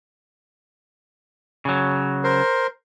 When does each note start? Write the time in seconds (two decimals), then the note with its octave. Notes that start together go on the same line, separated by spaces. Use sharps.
1.65 C#3 F#3
2.24 A#4 C5